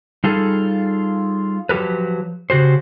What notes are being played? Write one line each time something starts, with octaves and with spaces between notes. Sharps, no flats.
G3 D#4 F4 G#4 A4
F3 F#3 G4 A#4 B4
C#3 F#4 G4 C5